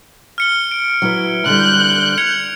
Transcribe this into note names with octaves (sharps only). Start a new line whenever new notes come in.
F6 C#7 G7
D7
F#3 E4 B4
D3 G3 F#6 G6
G#6 C#7 F7